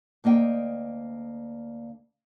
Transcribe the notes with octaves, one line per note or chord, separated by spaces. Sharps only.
D2 A#3 D#5 G5